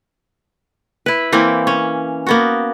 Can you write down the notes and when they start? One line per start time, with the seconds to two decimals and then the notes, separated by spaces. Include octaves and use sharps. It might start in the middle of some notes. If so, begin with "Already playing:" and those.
1.06 E4 B4
1.32 E3 A#3 C4
1.67 C#4
2.27 A#3 B3 F#4